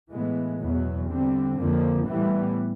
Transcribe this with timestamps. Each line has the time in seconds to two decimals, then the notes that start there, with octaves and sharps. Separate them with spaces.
0.11 A2 E3 G#3 B3
0.60 E2 B2 F#3 B3
1.09 D3 G3 C4
1.59 F2 D3 F3 A#3
2.08 A2 E3 G3 B3